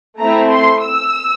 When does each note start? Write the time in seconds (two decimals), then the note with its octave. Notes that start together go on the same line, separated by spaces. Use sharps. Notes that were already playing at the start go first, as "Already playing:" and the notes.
0.20 A3 C4 E4 A#5
0.51 C6
0.83 E6